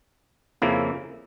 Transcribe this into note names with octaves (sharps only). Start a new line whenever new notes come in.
F2 C#3 F3 A#3 E4